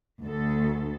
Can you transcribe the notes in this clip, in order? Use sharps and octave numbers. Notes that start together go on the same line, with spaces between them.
D2 A4